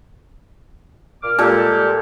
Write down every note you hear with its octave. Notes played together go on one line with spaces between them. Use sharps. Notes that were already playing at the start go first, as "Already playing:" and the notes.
A#2 D6 F6
A#2 G3 G#3 G4 A4 A#4